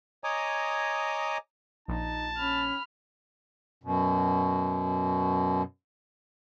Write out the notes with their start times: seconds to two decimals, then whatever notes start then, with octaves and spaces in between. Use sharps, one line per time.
0.24 C#5 D#5 G#5 A#5 D6 D#6
1.88 A#1 D#4 A5
2.38 C#4 B5 F6
3.84 F#2 B2